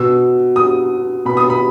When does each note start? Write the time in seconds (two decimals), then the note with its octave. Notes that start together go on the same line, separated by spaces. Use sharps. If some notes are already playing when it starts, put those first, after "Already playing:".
Already playing: B2 E6
0.56 D#6
1.25 B2 B5
1.37 D#6
1.50 B5